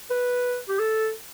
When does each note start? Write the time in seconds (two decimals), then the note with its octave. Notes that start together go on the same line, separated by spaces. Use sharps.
0.11 B4
0.69 G4
0.79 A4